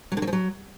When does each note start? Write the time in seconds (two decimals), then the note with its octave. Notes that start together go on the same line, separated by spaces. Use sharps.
0.12 F#3
0.17 D3
0.22 F#3
0.27 F3
0.33 F#3